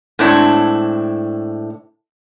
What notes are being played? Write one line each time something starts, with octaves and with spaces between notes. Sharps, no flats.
A2 G#3 C4 D4 E4 C#5